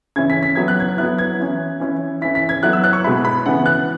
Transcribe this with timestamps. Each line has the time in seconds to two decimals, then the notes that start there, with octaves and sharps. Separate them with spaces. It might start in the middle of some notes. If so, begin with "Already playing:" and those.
0.16 C#3 E3 C#4 E4 G#6
0.30 B6
0.43 B6
0.55 F#3 B3 E4 G#6
0.68 F#6
0.80 G#6
0.98 F#3 B3 E4 F#6
1.18 G#6
1.39 E3 C#4 E4
1.80 E3 C#4 E4
2.22 E3 C#4 E4 B6
2.35 B6
2.49 G#6
2.63 F#3 B3 E4 F#6
2.73 E6
2.84 F#6
2.93 C#6
3.04 B2 G#3 E4 B5
3.25 B5
3.46 C#3 E3 B3 F#5
3.66 F#6